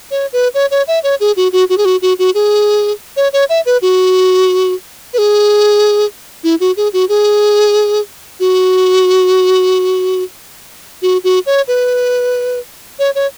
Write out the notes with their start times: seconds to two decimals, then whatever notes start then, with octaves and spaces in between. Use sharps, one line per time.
0.11 C#5
0.33 B4
0.54 C#5
0.71 C#5
0.88 E5
1.04 C#5
1.20 G#4
1.37 F#4
1.53 F#4
1.70 F#4
1.78 G#4
1.85 F#4
2.02 F#4
2.19 F#4
2.35 G#4
3.17 C#5
3.33 C#5
3.49 E5
3.66 B4
3.82 F#4
5.14 B4
5.18 G#4
6.44 E4
6.60 F#4
6.77 G#4
6.93 F#4
7.09 G#4
8.40 F#4
11.02 F#4
11.24 F#4
11.46 C#5
11.68 B4
12.99 C#5
13.15 C#5